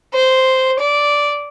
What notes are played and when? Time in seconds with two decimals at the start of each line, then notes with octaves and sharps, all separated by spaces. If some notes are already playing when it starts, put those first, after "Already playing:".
0.14 C5
0.80 D5